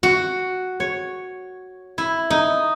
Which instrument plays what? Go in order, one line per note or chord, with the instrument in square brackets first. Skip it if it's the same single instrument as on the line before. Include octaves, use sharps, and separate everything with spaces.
[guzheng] F#4
C#5
E4
D#4